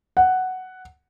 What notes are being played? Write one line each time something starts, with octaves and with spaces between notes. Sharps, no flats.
F#5